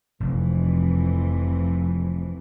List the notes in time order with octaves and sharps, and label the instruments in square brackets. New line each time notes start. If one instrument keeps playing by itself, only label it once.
[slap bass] F1 [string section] F2 C3 E3